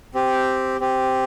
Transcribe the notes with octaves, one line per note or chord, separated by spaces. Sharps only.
C4 G4
C4 G4